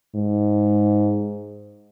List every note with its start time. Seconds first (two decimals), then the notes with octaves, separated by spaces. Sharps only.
0.15 G#2